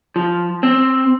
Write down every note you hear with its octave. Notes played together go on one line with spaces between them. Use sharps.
F3
C4